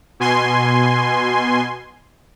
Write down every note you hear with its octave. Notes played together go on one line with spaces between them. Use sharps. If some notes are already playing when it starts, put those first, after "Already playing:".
B2 G#5 C6